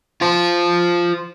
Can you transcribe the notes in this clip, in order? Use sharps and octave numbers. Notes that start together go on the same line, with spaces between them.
F4 C5